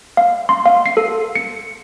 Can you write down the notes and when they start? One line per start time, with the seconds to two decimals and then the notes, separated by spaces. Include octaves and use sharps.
0.17 F5
0.49 C6
0.66 F5
0.86 C7
0.97 A4
1.36 C#7